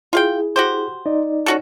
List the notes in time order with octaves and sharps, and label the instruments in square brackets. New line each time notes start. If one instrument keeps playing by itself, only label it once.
[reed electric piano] E4 G#4 [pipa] F4 F5 G5
[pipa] F#4 G4 C5
[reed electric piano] D#4 D5 D#5
[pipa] C#4 F#4 A4